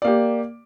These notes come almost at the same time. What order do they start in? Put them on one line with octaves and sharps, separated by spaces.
D5 A#3 G4